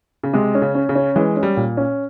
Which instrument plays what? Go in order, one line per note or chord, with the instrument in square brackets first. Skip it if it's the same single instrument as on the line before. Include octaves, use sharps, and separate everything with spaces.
[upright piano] C#3
[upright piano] C3 [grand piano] G#3
[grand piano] C#4
[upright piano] C#3
[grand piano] C#4
[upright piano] C#3
[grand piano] C#4
[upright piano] E3 [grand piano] G#3
[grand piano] C#4
[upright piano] G3
[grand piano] A#2
C#4